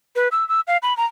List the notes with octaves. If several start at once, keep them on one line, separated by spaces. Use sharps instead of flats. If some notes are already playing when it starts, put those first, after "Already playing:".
B4
E6
E6
F5
B5
A#5